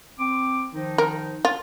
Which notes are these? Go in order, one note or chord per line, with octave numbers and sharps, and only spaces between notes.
C4 D6
D#3 F3 D#4
A#4
F4